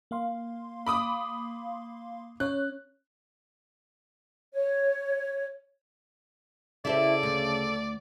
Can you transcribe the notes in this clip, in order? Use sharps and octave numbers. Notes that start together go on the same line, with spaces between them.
A#3 F5 C6
B5 D6 D#6
C#4 C#5 F#6
C#5
C#3 E4 G4 A4 C5 D5
D2 C#4